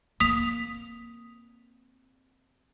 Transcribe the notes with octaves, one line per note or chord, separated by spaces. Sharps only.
A#3 C4 D#6 B6 F7